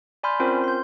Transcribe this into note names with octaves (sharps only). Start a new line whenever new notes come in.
D5 G#5 B5 C6 F6 G6
C4 C#4 F4 A#4 C5
C6 G6